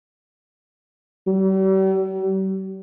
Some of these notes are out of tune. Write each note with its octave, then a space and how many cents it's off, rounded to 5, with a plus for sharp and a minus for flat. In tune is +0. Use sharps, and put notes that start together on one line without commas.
G3 -45